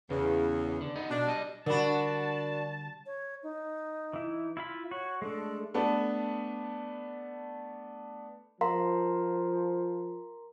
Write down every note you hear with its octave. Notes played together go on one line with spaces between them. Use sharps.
E2 C#3
D3
B3 D#4
B2 D4
G3 D#5
D3 G3 D4 F#4 A#4 A5 B5
C#5
D#4
E3 E4
E4 F4 B5
F#4 C#5
G#3 A3 D4 A4
A3 B3 D4
F3 A#4 F5 A#5 C6